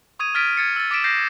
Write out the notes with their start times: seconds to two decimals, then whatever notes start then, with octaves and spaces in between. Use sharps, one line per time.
0.19 C#6 D#6 G#6 D#7
0.35 F6 G#6 A6 B6 D7 D#7
0.57 G#6 A6 C#7
0.76 E6 A6
0.91 D6 A6 B6 D7 E7
1.04 G6 A#6 C7